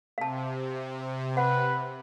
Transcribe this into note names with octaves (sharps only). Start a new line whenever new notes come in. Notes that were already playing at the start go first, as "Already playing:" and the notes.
C3 F5 A5
B4 F#5